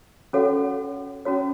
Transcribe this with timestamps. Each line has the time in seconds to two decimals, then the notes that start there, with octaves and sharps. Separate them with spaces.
0.33 C#4 F#4 A4 C#5 F#5
1.25 C#4 F#4 C#5